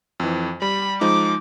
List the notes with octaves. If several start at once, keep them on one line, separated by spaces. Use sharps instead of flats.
F2 E3
G3 B5
F3 G#3 D#4 D6